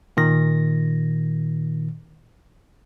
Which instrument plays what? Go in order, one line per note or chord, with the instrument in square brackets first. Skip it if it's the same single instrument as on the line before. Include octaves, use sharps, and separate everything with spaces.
[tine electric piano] A#2 D#3 A#6